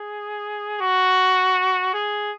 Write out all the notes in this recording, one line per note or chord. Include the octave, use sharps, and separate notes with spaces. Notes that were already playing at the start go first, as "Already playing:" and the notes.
Already playing: G#4
F#4
G#4